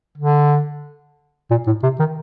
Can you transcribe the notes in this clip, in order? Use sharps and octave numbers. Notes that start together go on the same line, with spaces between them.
D3
A#2
A2
C3
D#3